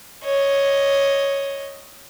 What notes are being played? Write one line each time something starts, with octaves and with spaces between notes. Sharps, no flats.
C#5 D#5